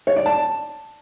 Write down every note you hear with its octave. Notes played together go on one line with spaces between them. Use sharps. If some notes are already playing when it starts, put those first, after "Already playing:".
C#5
D5
A5